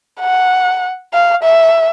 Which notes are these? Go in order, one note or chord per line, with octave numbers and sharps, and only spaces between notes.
F#5
F5
E5